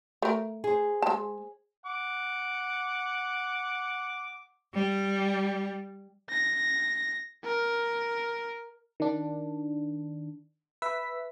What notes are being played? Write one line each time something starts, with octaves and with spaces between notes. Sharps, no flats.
A3 A#4
G#4 C5
G#3 A5
F#5 D6
G3
A#6
A#4
D#3 D4
B4 E5 B6